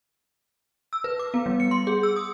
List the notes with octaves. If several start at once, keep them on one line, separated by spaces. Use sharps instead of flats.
E6
B4
D6
B3
G3
C#7
C6
G#4
E6
D#6